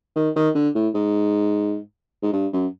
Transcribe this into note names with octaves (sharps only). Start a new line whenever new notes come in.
D#3
D#3
D3
A2
G#2
G#2
G2
F#2